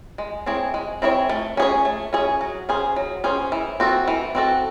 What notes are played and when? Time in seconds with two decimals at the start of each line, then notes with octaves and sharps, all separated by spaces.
0.18 G#3
0.46 C4 E4 G#4 C#5
0.74 G#3
1.02 C4 E4 G#4 C#5
1.29 A3
1.57 C#4 G#4 C#5
1.85 A3
2.13 C#4 G#4 C#5
2.41 F#3
2.69 C#4 G#4 C5
2.96 F#3
3.24 C#4 G#4 C5
3.52 E3
3.80 C4 F#4 A4
4.08 E3
4.35 C4 F#4 A4